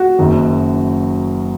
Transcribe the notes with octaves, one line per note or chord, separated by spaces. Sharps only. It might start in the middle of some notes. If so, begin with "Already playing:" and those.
Already playing: F#4
F#1 F#2 D#3